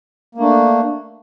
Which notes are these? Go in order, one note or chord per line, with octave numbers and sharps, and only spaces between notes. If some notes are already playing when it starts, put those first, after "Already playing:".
A3 A#3 D4